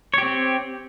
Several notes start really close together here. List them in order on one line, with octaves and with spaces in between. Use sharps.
C#5 G4 C4